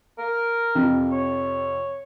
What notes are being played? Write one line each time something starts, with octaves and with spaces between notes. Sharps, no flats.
A#4
F2 C3
C#5